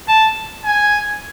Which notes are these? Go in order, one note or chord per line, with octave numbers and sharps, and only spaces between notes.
A5
G#5